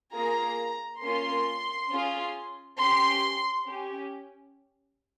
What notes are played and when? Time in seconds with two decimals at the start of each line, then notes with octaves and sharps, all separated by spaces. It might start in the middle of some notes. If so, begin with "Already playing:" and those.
0.13 A#3 F4 G#4 A#5
1.01 A#3 C#4 F4 C6
1.90 C#4 F4 G#4
2.78 C#4 G4 C6
3.67 C#4 G4